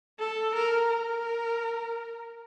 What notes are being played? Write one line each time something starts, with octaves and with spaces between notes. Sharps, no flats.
A4
A#4
A#4